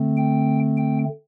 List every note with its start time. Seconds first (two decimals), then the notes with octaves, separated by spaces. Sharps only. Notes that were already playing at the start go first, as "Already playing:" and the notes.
Already playing: D3 A3 C4
0.17 G5
0.77 G5